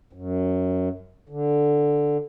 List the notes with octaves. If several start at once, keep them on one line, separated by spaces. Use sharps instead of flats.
F#2
D3